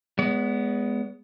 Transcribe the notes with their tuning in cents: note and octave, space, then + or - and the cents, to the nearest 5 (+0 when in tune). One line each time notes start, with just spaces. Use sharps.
G#3 +0 B3 +0 C#5 +45